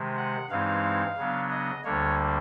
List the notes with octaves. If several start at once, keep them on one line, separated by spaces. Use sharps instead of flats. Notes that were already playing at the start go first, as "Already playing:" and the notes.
Already playing: C3 D#3 G#3
F#5
G2 E3 G#3 C4 D#4 F5
C#3 F#3 B3 D4
D#5
D2 D3 G3 A#3 D4 C#5